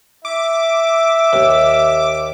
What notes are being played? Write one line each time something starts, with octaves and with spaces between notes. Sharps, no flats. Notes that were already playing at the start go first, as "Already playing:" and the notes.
E5 D6
D#2